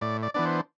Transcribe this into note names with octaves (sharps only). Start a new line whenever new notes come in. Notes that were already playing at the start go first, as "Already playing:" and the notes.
A2 D5
D5
E3 B3 D4 D5
C5